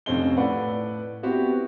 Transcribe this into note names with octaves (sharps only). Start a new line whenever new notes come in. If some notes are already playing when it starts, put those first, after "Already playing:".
F1 F2 C4 C#4 D#4 G7
A2 B4 D5 F#5
B3 C4 E4 F#4 G4